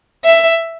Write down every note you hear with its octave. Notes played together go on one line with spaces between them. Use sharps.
E5